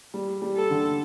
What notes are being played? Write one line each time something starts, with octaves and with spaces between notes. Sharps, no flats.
G3
G3
A4
D3